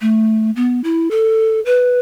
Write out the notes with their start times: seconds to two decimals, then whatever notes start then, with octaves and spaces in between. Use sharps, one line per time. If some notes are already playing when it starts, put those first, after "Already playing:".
0.01 A3
0.56 B3
0.84 E4
1.11 A4
1.66 B4